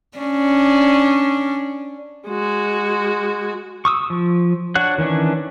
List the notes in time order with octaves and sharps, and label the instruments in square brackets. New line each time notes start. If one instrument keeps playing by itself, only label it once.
[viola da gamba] C#4 D4
[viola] G#3 F#4
[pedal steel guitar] C#6 D#6 E6
F3
D4 F#4 C#5 F#5 F#6
D#3 E3 C#4 D4